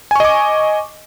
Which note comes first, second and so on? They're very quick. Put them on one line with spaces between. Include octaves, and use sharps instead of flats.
G#5 C#6 D#5 D6